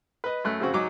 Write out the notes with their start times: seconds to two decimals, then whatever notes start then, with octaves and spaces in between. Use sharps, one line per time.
0.24 B4 D#5
0.44 F#2 A3 F#6
0.60 F2 C#3 C4 F#4
0.74 G#2 F#3 D#4 F#4 D#5 D6